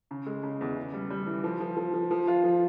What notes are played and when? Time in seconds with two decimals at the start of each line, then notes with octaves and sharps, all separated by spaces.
0.11 C#3
0.26 G#3
0.43 C#3
0.61 E2
0.76 C#3
0.94 G3
1.10 G3
1.26 E3
1.44 F3
1.60 F3
1.77 F3
1.94 F3
2.11 F3
2.27 F4
2.44 F3